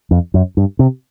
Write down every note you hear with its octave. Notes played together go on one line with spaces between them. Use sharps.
F2
F#2
G2
C3